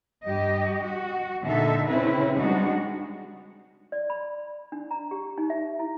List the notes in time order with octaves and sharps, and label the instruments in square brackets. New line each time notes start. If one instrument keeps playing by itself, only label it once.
[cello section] G2 G4 D#5
F#4
A#2 D3 D#4 A4 E5
C#3 C4 C#4 E4 B4
G3 G#3 D4 D#4 F#4
[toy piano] D5
B5
D4
A#5
G4
D#4
E5
E4